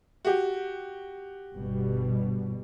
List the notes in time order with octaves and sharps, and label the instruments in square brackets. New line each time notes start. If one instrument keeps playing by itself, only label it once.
[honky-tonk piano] F#4 G4
[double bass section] G1 B2 G3